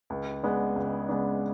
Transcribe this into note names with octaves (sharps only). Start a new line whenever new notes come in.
C#2
C#3 G#3 B3 D4
C#2
C#3 G#3 B3 D4